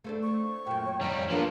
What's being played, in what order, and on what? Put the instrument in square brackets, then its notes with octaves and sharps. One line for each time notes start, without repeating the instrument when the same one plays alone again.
[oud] A3 C4 D4
[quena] C#6
[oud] F#2 A#2 [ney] G5
[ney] C#5
[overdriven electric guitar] F2 G3 [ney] C#5 [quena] A#5
[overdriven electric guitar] A#2 F3 [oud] B3 F4 A#4 [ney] D4